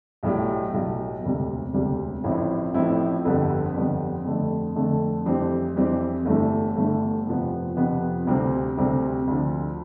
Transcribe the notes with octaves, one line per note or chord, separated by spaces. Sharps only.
B1 A2 G3
B1 A2 G3
E1 D2 C3 G3
E1 D2 C3 G3
A1 A2 F3 C4 E4
A1 A2 F3 C4 E4
G1 F2 D3 G3 B3
G1 F2 D3 G3 B3
F2 D3 A3
F2 D3 A3
F2 E3 G3 C4 G4
F2 E3 G3 C4 G4
G1 G2 E3 A3
G1 G2 E3 A3
F2 C3 F3 B3
F2 C3 F3 B3
D2 C3 G3 C4
D2 C3 G3 C4
D2 D3 F3